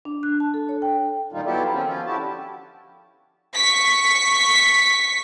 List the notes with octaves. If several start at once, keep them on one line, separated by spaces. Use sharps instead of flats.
D4
F#6
A5
A4
C#5
G5
F2 A#2 D#3 G3 D#4 F4
F#3 B3 E4 F4 G4 A4
D#3 C4 C#4
F3 C#4 F4
D3 E4 F#4 G4 A5
C#6 B6